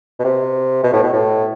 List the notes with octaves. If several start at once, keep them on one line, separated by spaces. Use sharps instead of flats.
B2
C3
B2
A2
B2
A2